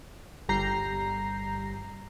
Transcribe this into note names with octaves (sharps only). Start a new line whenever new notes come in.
G1 G3 A#5 G6 C7